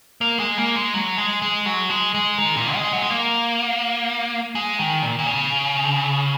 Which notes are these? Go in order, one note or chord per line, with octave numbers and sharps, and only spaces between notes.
A#3
G#3
A#3
G#3
F#3
G#3
G#3
F#3
G#3
G#3
D#3
A#2
G#3
F#3
G#3
A#3
G#3
D#3
A#2
A#2
C#3